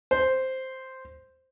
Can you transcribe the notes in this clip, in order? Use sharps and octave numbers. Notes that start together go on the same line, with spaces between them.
C5